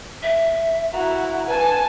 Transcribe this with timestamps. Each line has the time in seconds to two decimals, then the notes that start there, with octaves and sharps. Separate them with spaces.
0.23 E5
0.93 E4 F#4 A#5
1.47 B4 G#5 A5